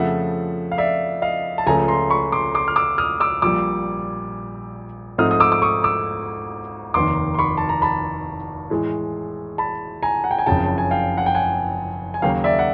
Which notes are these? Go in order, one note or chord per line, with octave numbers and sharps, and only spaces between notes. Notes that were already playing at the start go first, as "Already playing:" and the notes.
Already playing: F2 C#3 F3 A3 E5 F#5
F5
D5 E5
D#5 F5
A5
C#2 C#3 F3 A3 G#5 A#5
A#5 C6
B5 C#6
C6 D6
C6 D6
F6
D6 E6
D#6 F6
D6 E6
A#1 A#2 G3 D6 E6
G#2 F3 A3 C4 D#4 D#6 F6
D#6
D6 E6
D6
C#6 D#6
D6 E6
F1 D#2 D#3 C6 D6
C6
B5 C#6
A5
A#5
A5 B5
A2 E3 G#3
A5 B5
G#5 A#5
F#5
G5
G#5
F#1 F2 C#3 G5 A5
A5
G#5
F5 G5
F#5
G5
F#5 G#5
G#5
D#2 C#3 F#3 A#3 F5 G5
D5 E5
F#5